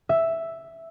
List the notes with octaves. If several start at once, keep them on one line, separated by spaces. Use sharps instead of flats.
E5